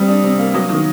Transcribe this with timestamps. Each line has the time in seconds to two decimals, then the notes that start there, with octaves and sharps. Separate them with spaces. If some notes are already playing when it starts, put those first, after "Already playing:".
Already playing: G3 C4 D#6
0.08 D4
0.23 C3
0.38 A#3
0.54 F#3 D#6
0.69 D#3 D#6